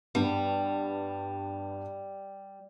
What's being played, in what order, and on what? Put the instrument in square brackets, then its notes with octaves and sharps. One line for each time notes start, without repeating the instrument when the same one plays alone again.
[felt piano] G2 B3 [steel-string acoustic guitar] G3